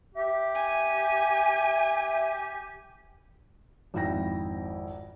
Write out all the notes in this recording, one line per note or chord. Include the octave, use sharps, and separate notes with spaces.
G4 E5
G#5
G#1 F2 E4 G5 A#6